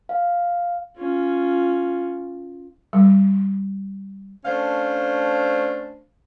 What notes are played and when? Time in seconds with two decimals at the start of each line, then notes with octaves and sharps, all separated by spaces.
0.09 F5
0.96 C#4 F4
2.93 G3
4.45 A3 C#4 D4 C5 F5